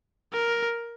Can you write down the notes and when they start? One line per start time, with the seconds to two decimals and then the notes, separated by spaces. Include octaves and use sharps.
0.34 A#4